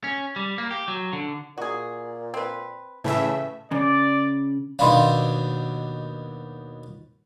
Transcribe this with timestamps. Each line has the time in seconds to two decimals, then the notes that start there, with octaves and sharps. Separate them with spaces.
0.04 C#4
0.36 G3
0.58 A#3
0.71 G4
0.88 F#3
1.13 D3
1.58 A#2 F#4 G#4
2.34 C4 B4
3.04 A2 C#3 E3 A3 E5
3.72 C#3 D5
4.79 D#2 B2 D4 F5 B5 C6